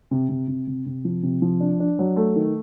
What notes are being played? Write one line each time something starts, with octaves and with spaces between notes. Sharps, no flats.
C3
C3
C3
C3
C3
F3
C3
F3
D4
D4
F#3
A3
D#3